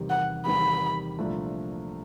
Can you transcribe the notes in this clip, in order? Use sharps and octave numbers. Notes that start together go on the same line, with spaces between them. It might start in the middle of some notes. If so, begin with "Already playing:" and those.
Already playing: E2 C3 D#3 G3
F#5
E2 C3 D#3 G3 B5
C2 A#2 F3 A3 D4